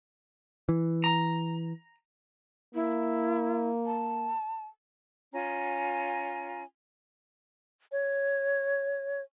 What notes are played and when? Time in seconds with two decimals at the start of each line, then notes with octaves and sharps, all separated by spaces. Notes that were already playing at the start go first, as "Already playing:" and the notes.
0.69 E3
1.04 A#5
2.75 A#3 E4
3.86 A5
5.33 C#4 F4 G#5 A#5
7.92 C#5